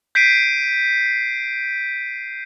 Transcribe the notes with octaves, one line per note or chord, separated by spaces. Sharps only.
G6 B6 C7 D7 D#7